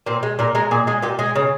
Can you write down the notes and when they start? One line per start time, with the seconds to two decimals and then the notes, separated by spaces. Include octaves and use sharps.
0.06 A#2 C4
0.23 G#3
0.39 A#2 A#4
0.55 G#3 A#4
0.71 A#2 G#4
0.87 G#3 G#4
1.02 A#2 G4
1.19 G#3 G#4
1.36 C#3